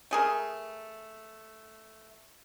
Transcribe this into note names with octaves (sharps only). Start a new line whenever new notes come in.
A3 G#4 A#4